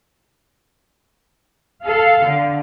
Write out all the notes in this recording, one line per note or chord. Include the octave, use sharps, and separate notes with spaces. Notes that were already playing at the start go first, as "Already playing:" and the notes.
A4 F5
D3